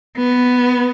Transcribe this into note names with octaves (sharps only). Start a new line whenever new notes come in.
B3